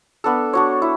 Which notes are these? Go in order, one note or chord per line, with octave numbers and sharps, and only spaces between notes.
B3 D4 A4
D4 F#4 C#5
E4